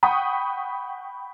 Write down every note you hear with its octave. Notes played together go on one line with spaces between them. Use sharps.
F#5 G5 B5 C#6 D#6